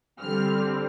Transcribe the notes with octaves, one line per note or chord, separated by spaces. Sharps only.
D3 G3 C4 F6